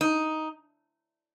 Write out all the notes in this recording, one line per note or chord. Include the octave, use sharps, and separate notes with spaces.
D#4